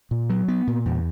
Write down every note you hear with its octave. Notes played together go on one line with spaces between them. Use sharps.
A#2
F#3
B3
A#2
E2